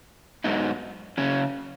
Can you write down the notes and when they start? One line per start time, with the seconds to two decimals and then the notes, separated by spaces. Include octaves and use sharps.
0.44 G#2 F#3 B3 D#4
1.18 C#3 F#3 C#4